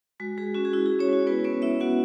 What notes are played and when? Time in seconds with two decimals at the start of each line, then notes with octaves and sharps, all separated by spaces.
0.20 G#3 F#4
0.37 G#3 G#4
0.55 C#4 F#4
0.65 G#4
0.73 E4 F#4
0.86 G#4
0.92 G#3
0.99 C#4 C#5
1.09 G#3 F#4
1.26 B3 E4 B4
1.44 B3 C#4 C#5
1.62 E4 E5
1.80 B3 F#4 F#5